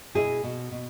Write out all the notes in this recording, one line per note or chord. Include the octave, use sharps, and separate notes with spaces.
B2 E4 G#4
B2
B2